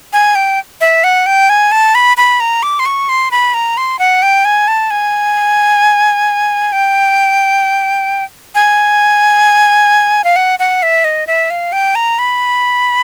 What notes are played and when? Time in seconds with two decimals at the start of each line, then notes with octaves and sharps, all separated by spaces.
0.13 G#5
0.35 G5
0.81 E5
1.04 F#5
1.26 G5
1.50 G#5
1.72 A5
1.95 B5
2.17 B5
2.40 A#5
2.63 D6
2.79 C6
2.86 C#6
3.09 C6
3.31 B5
3.54 A#5
3.77 C6
3.99 F#5
4.22 G5
4.45 G#5
4.68 A5
4.91 G#5
6.72 G5
8.55 G#5
10.24 F5
10.36 F#5
10.59 F#5
10.83 E5
11.04 D#5
11.27 E5
11.50 F5
11.72 G5
11.95 A#5
12.19 B5